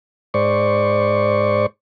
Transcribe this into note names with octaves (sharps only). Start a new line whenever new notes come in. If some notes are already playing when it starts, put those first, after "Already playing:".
G#2 C5 D5 C#6